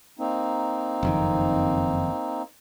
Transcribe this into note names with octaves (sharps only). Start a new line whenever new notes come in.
A#3 C4 D#4
F#1 F2 D#3